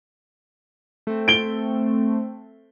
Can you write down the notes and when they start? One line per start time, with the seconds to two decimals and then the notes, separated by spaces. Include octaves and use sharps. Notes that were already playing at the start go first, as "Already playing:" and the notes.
1.07 A3 C4
1.28 D7 G7